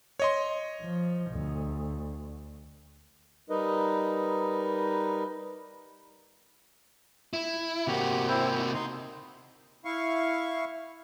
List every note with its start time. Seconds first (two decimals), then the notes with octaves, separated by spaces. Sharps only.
0.20 C#5 D#5 C6
0.81 F3
1.31 D2
3.50 G3 D#4 A#4 B4 D#5
7.33 E4
7.87 C3 A#3 F#4 G4
8.28 C4 E4 C5
8.54 F#4
8.74 D#4 C6
9.85 E4 F5 C#6